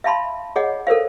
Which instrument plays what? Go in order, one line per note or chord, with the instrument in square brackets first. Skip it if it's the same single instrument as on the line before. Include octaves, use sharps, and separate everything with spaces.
[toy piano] E5 F5 A5 B5 C6
G#4 C#5 D#5 F#5
A4 A#4 C5 F5